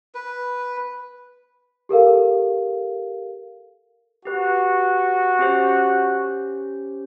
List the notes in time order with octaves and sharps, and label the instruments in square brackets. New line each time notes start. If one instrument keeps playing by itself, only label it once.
[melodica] B4
[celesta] G4 A4 A#4 F5
[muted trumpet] F#4 [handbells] G4 B4
[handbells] C#4 G4 C5